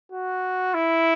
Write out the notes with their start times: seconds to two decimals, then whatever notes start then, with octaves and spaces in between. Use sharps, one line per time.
0.12 F#4
0.74 E4